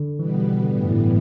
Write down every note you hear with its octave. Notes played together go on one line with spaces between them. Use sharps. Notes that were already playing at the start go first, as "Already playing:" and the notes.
Already playing: D3
B2 E3 G3 B3
A2 D3 E3 G3 B3
G2
A2